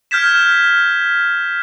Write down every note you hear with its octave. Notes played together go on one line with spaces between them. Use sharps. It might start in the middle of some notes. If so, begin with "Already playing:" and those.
F6 G6 G#6 B6 E7